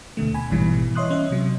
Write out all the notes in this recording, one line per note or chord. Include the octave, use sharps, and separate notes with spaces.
D2 B2 D3 A3
G#5 B5
A1 G#2 B2 E3 G3
C#5 D#5 E5 C6 D#6 F#6
C#4 D#5 E5
C3 F#3